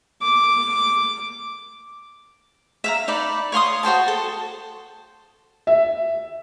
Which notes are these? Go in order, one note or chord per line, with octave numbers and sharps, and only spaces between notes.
D6
E5 F5 A#5
D#4 D5 B5
C#5 F5 C6 D#6
F#4 C5 G5 A5
A4
E5